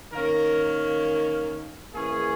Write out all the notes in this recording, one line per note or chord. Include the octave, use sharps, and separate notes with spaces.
D#3 A#3 C#4 A#4
E3 A#3 C#4 G#4